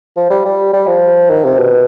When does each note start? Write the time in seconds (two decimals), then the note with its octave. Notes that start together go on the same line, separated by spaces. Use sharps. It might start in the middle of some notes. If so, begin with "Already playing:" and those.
0.17 F3
0.30 G3
0.45 G3
0.73 G3
0.87 F3
1.30 D#3
1.45 C3
1.58 B2